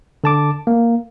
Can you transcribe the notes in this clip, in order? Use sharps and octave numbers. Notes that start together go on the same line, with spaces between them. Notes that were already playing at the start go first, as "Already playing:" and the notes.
D3 A5 D6
A#3